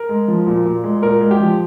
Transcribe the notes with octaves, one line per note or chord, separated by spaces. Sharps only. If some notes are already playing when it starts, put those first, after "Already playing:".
Already playing: A#4
G#3
F3
A#2
A#2
G#3
A#2 A#4
G#3
G4
F3